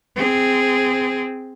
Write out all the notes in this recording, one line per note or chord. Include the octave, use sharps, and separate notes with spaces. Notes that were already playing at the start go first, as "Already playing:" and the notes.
C4 G#4